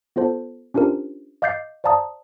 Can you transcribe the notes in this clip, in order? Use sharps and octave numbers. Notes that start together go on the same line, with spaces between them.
B3 F4 A4 C5 A5
C#4 D4 F4 G4 A#4 C5
D#5 F5 D6 G6 A6 C7
C5 D5 F5 A5 A#5 D#6